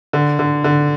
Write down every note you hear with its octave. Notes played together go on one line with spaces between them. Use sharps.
D3
D3
D3